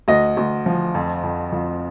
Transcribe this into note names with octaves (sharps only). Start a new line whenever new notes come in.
D2 D#5
D2
F3
F2
F2
F2